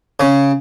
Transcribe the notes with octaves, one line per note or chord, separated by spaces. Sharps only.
C#3